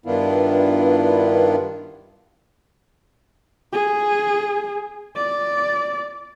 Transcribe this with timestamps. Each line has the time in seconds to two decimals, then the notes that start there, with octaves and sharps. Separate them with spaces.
0.06 G2 D#3 B3 D4 E4 F4
3.73 G#4
5.16 D5